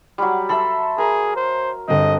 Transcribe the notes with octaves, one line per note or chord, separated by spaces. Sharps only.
F#3 G3
A4 E5 B5 C6
G#4 A#4
C5
G1 C4 D#5